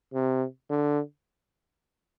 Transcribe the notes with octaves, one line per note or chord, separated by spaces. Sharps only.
C3
D3